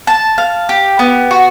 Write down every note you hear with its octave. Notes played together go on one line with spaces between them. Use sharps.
A5
F5
G4
B3
F#4